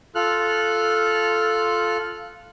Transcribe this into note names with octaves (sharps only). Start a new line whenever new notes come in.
F4 A4 F6 F#6